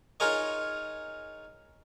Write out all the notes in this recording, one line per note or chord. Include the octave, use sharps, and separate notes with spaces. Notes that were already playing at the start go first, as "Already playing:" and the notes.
D#4 F4 G#4 A#4 C#5 D#5